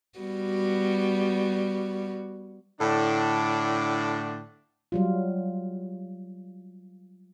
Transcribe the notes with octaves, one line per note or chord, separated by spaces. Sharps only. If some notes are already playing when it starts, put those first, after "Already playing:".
G3 B3 F#4
A2 D3 D4
F#3 G3 F4